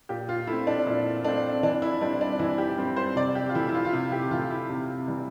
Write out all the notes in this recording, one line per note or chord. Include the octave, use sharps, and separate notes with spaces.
A#2 G4
F4
A3 E4
C4
D4
A#2 E4
A3 C4 D4
E3 D4
E4
G3 C4 D4
D4
E3 E4
G4
G3 C4
C5
C3 D5
G4
F4
E3 A3 E4
E4
F4
F4
C3 E4
G4
E3 A3 F4
E4
C3
E3 G3